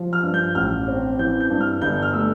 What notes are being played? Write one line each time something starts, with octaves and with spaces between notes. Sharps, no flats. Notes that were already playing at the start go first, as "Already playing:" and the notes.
Already playing: F3
F6
G2
G6
A1 F6
C4
E3 G6
G6
G2
F6
G1 G6
F6
A3 E6